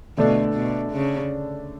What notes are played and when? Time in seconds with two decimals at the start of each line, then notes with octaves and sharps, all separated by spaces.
0.17 B2 D3 A3 D4
0.55 B2
0.92 C#3